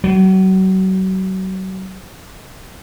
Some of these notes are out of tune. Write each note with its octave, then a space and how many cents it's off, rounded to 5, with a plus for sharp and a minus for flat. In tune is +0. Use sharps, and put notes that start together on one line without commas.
F#3 +35